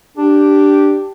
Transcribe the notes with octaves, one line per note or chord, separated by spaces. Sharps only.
D4 G4